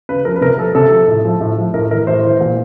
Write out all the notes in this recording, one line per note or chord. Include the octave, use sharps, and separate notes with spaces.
C#3 B4
F3 A#4
B4
C3 A#4
F3 A4
C3 A4
F3
A2
F3
A2
F3
A2 A#4
E3 A#4
A2 C5
E3
A#2